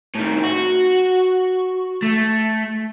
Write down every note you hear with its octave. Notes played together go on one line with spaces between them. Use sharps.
A2 D#3
F#4
A3